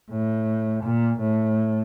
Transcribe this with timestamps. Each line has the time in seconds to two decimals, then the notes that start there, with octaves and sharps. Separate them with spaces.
0.10 A2
0.83 A#2
1.20 A2